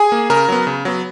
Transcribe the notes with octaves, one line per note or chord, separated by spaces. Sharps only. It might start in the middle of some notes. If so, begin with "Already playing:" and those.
Already playing: G#4 G#5
A#3
C#3 A#4 A#5
F#3 B3
C#3
F#3 B3